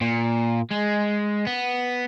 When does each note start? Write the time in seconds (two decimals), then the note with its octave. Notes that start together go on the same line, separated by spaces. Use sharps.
0.01 A#2
0.71 G#3
1.47 B3